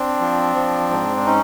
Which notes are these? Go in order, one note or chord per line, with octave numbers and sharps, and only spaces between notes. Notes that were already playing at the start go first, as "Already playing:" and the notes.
Already playing: C4 D4
F3
F3
G#2
D4
C#4 D#4